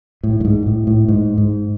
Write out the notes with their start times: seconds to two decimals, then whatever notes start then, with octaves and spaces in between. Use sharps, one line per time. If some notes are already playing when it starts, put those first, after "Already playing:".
0.23 A2
0.40 G2
0.45 G#2
0.66 A2
0.87 A2
1.08 G#2
1.38 G#2